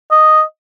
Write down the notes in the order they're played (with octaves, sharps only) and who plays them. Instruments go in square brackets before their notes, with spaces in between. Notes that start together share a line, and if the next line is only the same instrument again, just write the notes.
[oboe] D#5